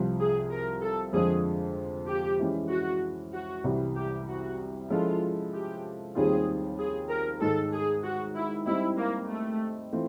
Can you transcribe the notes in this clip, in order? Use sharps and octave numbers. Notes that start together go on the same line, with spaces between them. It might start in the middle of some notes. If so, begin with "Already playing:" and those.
Already playing: C2 C3 F3
G#4
A#4
A4
F2 D3 F3 G#3 G#4
G4
E3 G#3 C#4
F#4
F#4
C2 C3 E3 G3
G4
F#4
F3 G#3 C#4 E4 F4 A4
G4
D#2 D#3 G3 C4 F4 G#4
G#4
A#4
G#2 D#3 G#3 A4
G#4
F#4
E4
G3 C4 D#4 E4
A#3
A3
E3 A3 C4 F4